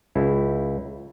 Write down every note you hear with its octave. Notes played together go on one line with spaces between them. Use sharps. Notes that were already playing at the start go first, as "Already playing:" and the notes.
C#2 E4